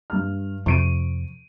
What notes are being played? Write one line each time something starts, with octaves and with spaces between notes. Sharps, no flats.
G2 F6
F2 C3 C#6 D7 D#7